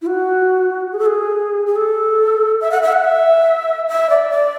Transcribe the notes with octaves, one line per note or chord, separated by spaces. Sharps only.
E4
F#4
G#4
A4
G#4
G#4
A4
E5
F#5
E5
F#5
E5
E5
D5
D5